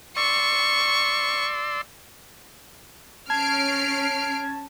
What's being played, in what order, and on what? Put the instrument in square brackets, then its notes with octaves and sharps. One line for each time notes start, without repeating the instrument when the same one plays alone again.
[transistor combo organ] D5 C6 E6 [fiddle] C#6
[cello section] C#4 [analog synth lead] A5 [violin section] F6 C7 D7 [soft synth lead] G#6